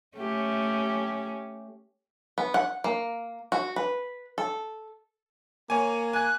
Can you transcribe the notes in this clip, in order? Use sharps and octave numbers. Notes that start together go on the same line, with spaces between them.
A3 C#4 G4
B3
F#5
A#3
F#4
B4
A4
A#3 C#5 G#5
G#5 F#6 G#6